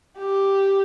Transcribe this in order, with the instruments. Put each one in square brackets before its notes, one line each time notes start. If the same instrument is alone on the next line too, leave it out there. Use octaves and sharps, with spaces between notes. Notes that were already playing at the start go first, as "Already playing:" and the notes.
[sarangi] G4